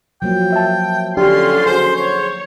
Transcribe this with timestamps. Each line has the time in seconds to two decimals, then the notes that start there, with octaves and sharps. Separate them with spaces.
0.22 F3 F#3 A#3 G5
0.52 E5 A5
1.17 D3 C#4 D4 F4 G4 C6
1.66 F#4 G#4 C5
1.96 C5 C#5